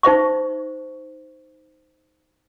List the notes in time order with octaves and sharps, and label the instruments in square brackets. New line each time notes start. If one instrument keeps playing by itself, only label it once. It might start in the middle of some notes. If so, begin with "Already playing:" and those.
[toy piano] D#4 C5 E5 C#6